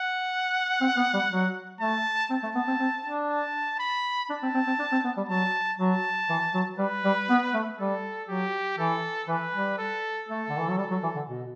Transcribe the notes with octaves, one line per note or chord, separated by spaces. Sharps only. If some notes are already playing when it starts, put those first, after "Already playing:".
Already playing: F#5
C4
B3
G3
F#3
A3 A5
C4 A5
A3
B3
C4
C4
D4
A5
B5
D4 A5
C4
C4
C4
D4
C4
B3
G3
F#3 A5
F#3 A5
E3
F#3
G3 B4
G3
B3
A3
G3 A4
F#3 G4
E3 A4
E3 B4
G3
A4
A3 A4
D3
E3
F#3
G3 A4
F#3
E3
D3
B2